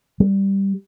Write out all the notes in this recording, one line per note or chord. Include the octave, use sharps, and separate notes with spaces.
G3